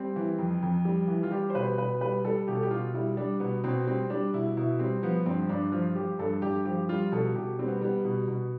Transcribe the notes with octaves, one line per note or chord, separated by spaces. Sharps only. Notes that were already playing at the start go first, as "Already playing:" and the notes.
Already playing: G3 C4
E3
F2
F2
G3
E3
F4
G3 G4
C5
B2 B4
B2 B4
G3 B4
G3 A4
B2 G4
A4
G4
B2 F4
G3 E4
G3 D4
B2 B3
B2 C4
G3 C4
G3 D4
B2 E4
B2 E4
G3 C4
F3 B3
G2 C4
G2 D4
F3 F4
F3 G4
G2 A4
G2 G4
F3 G4
G3 F4
B2 A4
B2 G4
G3 C4
B3
G3 B3
B2
B2